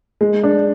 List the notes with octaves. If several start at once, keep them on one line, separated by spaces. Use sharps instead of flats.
G#3
D4